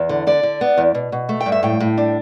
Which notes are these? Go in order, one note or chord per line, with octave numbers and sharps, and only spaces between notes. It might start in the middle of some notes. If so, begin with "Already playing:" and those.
Already playing: E2
D3
D3 D5
D3
B3
E2
B2
B2
A3
G5
G2
E5
A2 G5
A2
D4